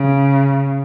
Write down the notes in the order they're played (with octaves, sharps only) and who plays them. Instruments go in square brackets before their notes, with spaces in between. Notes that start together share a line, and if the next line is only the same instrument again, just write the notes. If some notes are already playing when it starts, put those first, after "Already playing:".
Already playing: [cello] C#3